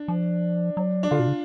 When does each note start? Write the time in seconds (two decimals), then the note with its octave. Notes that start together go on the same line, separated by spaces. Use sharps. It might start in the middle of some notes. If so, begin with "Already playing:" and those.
Already playing: D4
0.08 F3
0.77 F#3
1.03 D4
1.11 D3 F4
1.19 B2
1.28 C#3